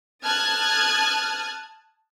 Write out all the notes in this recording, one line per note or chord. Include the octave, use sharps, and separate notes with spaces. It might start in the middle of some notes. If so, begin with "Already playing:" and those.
A5 D#6 F6 F#6 G#6 A6